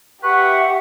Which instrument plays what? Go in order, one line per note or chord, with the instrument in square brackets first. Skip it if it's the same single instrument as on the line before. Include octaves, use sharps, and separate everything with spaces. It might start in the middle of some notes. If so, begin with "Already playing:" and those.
[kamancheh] G4 [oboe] B4 [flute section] E5 F#5 [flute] C#6